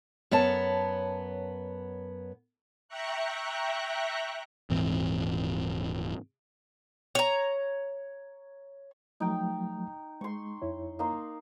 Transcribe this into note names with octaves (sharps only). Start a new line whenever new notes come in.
F#2 B3 C#5 A5
E5 G5 A#5 C#6 F#6
D#1 G#2 E3 C4
C#5 A#5
F3 F#3 A3 D#4 G5
G#3 C6 C#6
F2 E4 C#5
A#3 D#4 C6